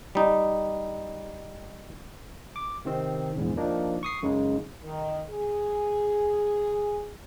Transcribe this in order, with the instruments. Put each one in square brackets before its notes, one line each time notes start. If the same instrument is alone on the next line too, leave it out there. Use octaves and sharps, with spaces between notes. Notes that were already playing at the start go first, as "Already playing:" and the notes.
[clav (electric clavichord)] G3 D#4
[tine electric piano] D6
C3 D#3 C4
A#1 E2 G#2
F3 A#3 D4 D#4
C#6 D#6 C7
F#2 C#3 G#3 D#4
[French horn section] D#3
G#4